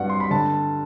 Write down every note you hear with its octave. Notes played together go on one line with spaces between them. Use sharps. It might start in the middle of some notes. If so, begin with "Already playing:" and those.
Already playing: G2 F#3 F#5
C6
B5
D3 A5